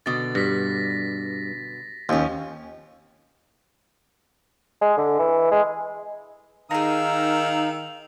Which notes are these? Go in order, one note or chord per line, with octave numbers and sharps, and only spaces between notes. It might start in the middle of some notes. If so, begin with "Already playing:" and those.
B2 D3 A6
G2 A#6 B6
D#2 F3 C#4
G#3
D3
E3
G#3
D#3 D#4 G#4 A#4 F5 A#5 E6